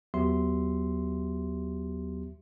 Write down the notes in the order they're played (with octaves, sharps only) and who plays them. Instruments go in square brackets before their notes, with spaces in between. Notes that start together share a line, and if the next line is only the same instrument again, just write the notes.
[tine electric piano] D#2 F#3 B3 G4 E5 C6